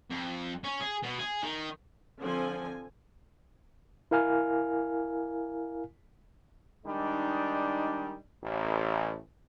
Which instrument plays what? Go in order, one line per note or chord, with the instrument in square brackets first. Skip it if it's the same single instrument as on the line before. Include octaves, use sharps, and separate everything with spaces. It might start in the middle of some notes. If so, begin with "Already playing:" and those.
[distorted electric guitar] F2
C#4
G#4
B2
G#4
D#3
[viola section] D3 F3 C4 G#5
[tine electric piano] E4 A#4 F5 G#5 F6
[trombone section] D#3 G3 G#3 D4 D#4
A1